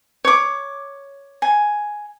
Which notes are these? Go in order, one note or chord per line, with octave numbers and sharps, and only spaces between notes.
C#5 D6
G#5